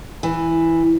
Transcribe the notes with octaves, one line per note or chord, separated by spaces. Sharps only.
E3